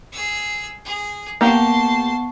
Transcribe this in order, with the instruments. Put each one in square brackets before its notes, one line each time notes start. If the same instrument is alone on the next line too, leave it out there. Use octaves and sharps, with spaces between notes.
[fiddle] G#4 E6
G#4
[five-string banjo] A#3 G4 [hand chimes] B3 F#5 C#6 [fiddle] A5 C6